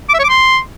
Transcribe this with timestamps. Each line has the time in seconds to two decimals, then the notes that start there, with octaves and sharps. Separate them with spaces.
0.09 D6
0.14 E5
0.19 C#5
0.24 D6
0.29 C6